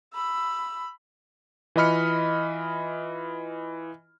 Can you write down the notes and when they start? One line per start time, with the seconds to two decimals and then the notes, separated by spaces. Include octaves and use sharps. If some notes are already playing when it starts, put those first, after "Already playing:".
0.14 B5 E6
1.76 E3 F4 D#5 B5 F6 C#7